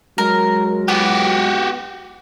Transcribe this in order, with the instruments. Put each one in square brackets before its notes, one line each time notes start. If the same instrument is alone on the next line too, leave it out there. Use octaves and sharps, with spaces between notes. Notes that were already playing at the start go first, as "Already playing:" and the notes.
[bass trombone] F#3 [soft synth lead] G#3 [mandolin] A#4
[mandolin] B3 [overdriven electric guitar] F#4 G4